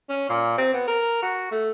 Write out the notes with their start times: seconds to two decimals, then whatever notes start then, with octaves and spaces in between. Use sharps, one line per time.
0.09 C#4
0.29 A#2
0.58 C4
0.74 B3
0.88 A#4
1.23 F#4
1.52 A3